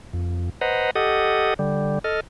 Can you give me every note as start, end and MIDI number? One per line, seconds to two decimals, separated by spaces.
0.13 0.49 41
0.61 0.91 71
0.61 0.91 72
0.61 0.91 75
0.61 0.91 78
0.61 0.91 82
0.95 1.54 67
0.95 1.54 69
0.95 1.54 75
0.95 1.54 78
0.95 1.54 87
1.59 1.99 50
1.59 1.99 55
2.04 2.20 69
2.04 2.20 75
2.04 2.20 89